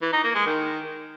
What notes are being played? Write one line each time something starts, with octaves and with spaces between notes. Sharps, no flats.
E3
D#4
A#3
G#3
D#3